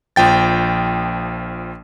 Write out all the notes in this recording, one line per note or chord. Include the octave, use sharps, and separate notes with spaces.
A#1 F3 G5 A6